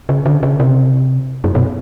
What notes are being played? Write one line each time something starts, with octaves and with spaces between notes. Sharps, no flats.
C#3
D3
C#3
C3
F#2
B2